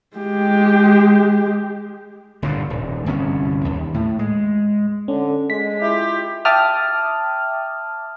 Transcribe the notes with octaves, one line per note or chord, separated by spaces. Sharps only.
G#3 G4
G1 G2 A#2 D3
D#1
G1 C2 C4 C#4
D#2
A2
G#3
D3 C#4
G#3 B6
E4 F4 G4
E5 G5 A5 D6 D#6 F6